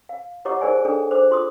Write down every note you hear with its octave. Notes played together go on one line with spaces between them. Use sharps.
F5
E4 G4 C#5 D#5 F#5 D6
D#4 G#4 A#4 C5 D5 G#5
D4 G#4 A4
C5 D6
F4 C6 D6 D#6